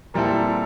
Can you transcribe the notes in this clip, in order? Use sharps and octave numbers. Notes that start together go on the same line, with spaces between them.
A#2 G3 C4 E4 A4 A#5